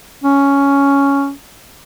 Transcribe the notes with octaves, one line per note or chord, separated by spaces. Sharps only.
C#4